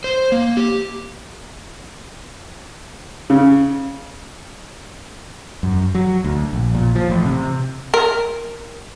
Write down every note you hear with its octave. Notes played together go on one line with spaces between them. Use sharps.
C5
A#3
G4
C#3
F#2
F#3
D2
A#1
A#2
F3
A1
C3
A#4